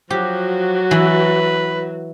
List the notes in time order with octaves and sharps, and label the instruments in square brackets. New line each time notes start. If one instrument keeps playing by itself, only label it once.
[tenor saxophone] F3 [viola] F#3 F#4 [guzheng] G4
[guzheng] E3 [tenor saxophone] B4